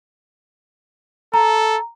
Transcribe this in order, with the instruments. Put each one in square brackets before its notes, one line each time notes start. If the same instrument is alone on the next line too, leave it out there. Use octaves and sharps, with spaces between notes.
[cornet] A4 [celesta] A#5